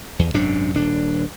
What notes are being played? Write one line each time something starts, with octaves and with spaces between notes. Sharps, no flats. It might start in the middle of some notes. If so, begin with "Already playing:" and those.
E2
G#1 F#2 C3 D4
D#1 D4